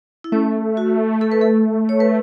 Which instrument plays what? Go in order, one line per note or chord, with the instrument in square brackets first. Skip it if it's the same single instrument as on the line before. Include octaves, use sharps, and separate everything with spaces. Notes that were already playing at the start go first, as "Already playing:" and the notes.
[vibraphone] E4
[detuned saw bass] A3 [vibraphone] C#4
[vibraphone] F#4
A4
B4
A4
C#5
B4